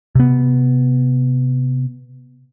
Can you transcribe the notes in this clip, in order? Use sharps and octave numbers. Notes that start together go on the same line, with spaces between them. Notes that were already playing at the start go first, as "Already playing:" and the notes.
C3 B3